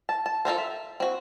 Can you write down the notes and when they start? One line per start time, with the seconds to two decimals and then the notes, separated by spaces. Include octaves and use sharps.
0.09 A5
0.26 A5
0.45 F4 A4 A#4 C5
0.58 E5
1.00 C4 F#4